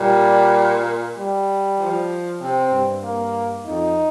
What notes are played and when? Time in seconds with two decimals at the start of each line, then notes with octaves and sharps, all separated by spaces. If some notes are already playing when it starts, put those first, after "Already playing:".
Already playing: A#2 G3
1.17 G3
1.80 F3
2.41 C3 C4
2.72 G2
3.03 A#3
3.65 F2 D#4